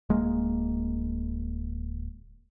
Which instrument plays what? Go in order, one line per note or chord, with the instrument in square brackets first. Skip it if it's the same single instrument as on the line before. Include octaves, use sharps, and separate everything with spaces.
[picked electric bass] D1 G#3 A#3